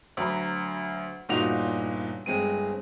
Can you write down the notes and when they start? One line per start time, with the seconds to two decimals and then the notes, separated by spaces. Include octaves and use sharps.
0.17 D2 F#3 A#5 B5
1.29 G1 A#2 D#4 F#4 F7
2.26 G1 G#3 C4 D#7